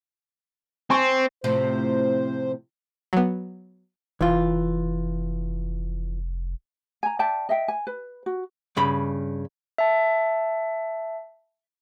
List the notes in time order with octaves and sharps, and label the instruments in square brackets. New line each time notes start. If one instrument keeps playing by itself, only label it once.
[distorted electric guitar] C4 [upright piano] G#5 C6 C#6
[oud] A2 C3 F3 [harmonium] C5
[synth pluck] F#3 B3
[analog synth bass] F1 [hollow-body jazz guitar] E3 F4
[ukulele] G#5 A#5
D5 E5 G5 A5
D#5 E5 G5
G#5
B4
F#4
[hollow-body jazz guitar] G2 C#3 B5
[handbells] E5 A5